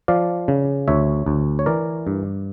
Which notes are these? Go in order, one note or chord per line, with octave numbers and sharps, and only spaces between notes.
F3 D5 F5
C#3
D2 C#5 E5
D2
C#5
E3 A#4 D5
G2